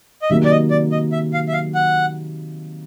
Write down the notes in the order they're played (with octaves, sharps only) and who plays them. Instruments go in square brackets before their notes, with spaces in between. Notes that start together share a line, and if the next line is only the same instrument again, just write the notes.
[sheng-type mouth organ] D#5
[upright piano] C3 D#3 F#3 A#3 D#4 [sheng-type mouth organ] E5
[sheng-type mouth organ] D5
D#5
D5
D#5
E5
F5
E5
F5
F#5